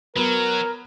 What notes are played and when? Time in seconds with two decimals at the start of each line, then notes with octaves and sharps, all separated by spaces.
0.16 F#3 B3 A#4